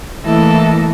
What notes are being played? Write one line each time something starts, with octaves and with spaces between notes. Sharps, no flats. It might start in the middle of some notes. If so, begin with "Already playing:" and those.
E3 A3 A#3 E4 A4 D#5